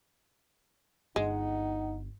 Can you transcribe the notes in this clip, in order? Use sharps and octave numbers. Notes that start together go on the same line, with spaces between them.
G1 G#3 D#4 F#5